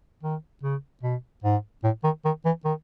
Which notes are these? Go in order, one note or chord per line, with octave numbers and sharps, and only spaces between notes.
D#3
C#3
B2
G#2
A2
D#3
D#3
E3
D#3